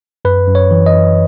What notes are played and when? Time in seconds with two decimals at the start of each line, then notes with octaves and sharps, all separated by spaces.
0.25 F#2 B4
0.47 F#2
0.55 C#5
0.71 E3
0.86 D#5
0.94 F#2